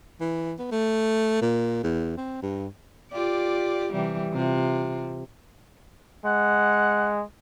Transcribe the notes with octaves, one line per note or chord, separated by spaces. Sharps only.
E3
B3
A3
A#2
E2
C4
G2
F4 G4 D5
C3 E3 G3
C3 F4
G#3 F#5